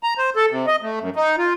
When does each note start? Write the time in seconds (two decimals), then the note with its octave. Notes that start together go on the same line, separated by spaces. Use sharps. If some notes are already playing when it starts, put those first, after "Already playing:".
0.03 A#5
0.18 C5
0.36 A4
0.51 C3
0.67 D#5
0.82 A3
1.00 F#2
1.16 D#4
1.38 F4